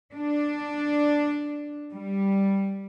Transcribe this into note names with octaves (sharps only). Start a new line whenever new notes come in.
D4
G3